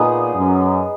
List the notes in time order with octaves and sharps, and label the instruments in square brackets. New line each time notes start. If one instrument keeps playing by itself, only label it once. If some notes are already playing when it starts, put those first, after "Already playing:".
Already playing: [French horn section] A#2 [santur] B3 D#4 G#4
[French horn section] F#2